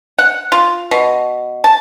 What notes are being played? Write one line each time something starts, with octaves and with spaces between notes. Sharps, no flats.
F#5
F4
B2
A5